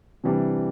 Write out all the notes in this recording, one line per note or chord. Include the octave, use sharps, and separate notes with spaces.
C3 E3 G3 D4